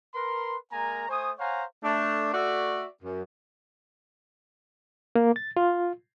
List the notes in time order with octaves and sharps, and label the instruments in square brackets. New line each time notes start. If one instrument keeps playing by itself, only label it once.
[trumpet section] A#4 B4 C6
G#3 A#3 A#4 G#5 A#5
A3 C5 G#5 C#6 D#6
C5 C#5 F5 F#5 G#5 A#5
[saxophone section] A3 D4
A3 F#4 D5 E5
F#2
[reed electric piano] A#3
A6
F4